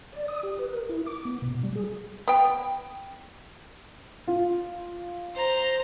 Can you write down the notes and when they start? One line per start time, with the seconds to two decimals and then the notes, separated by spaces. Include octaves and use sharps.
0.13 D5
0.28 D#6
0.43 G4
0.59 B4
0.71 A#4
0.89 E4
1.06 D6
1.25 B3
1.42 B2
1.63 G3
1.75 G#4
2.28 B3 G5
4.28 F4
5.35 C5 A#5